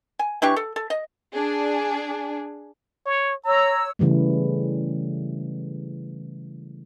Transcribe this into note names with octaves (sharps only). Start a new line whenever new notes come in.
G#5
E3 D4 G4 C#6
A4
A4
D#5
D4 G#4
C#5
C#5 A#5 E6
C#3 E3 G3 A3